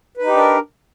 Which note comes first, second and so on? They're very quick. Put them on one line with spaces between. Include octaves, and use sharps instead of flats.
B4 D#4 G4 D4 A#4